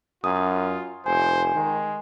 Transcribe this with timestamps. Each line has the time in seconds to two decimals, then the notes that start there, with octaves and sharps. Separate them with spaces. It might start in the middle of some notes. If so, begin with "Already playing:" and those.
0.24 F#2 F4 D#6
1.06 F1 C5 G#5
1.55 D#3 G#3